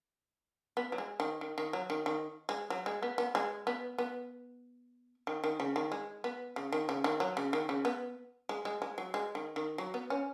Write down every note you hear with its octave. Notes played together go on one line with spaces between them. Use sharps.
B3
F#3
G#3
D#3
D#3
D#3
F#3
D#3
D#3
G#3
F#3
G#3
B3
B3
G#3
B3
B3
D#3
D#3
C#3
D#3
G#3
B3
C#3
D#3
C#3
D#3
F#3
C#3
D#3
C#3
B3
G#3
G#3
G#3
F#3
G#3
D#3
D#3
F#3
B3
C#4